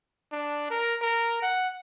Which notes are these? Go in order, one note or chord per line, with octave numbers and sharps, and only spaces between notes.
D4
A#4
A#4
F#5